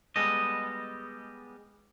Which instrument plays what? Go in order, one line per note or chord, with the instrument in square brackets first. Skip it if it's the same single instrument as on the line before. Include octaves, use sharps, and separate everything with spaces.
[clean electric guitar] G3 G#3 B3 A4 D#5